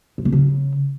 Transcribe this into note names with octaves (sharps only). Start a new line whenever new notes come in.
G2
B2
C#3